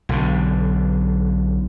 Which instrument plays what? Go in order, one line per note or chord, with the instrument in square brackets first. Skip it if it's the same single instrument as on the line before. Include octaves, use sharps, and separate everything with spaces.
[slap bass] B1 D3